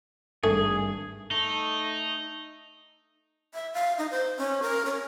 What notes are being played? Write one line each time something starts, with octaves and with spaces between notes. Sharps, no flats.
G#1 G2 A3 G#4
A3 D#4
E5
F5
D#4
C5
C#4
A#4
C#4